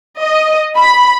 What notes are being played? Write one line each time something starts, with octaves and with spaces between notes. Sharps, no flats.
D#5
B5